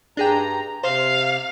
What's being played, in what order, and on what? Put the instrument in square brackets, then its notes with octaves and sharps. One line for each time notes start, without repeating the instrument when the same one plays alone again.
[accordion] G2 A#5 [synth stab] D4 G#4 G5
[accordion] C3 [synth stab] C5 [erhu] F5